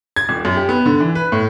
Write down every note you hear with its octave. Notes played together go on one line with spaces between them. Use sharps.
G#6
D#1
F#2
G4
B3
D3
E3
B4
A2